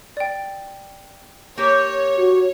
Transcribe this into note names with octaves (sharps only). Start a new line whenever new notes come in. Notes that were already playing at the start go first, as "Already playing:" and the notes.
D5 G5
A#3 G4 C#5
F#4